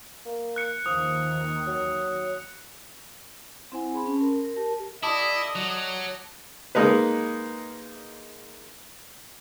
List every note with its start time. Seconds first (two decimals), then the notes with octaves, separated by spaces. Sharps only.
0.26 A#3
0.56 F#6 C#7
0.86 D#2 D#3 F3 D#6
1.66 F#3
3.72 C4 E4 C5 F#5 G#5
3.94 G#4 B5 C6
4.06 C#4 A5
4.21 A#4 C6
4.41 A#4
4.56 G4 A#4 A5
5.03 G3 A3 E4 D#5 A5 D6 D#6
5.55 F#3
6.75 G#3 A#3 D#4 B4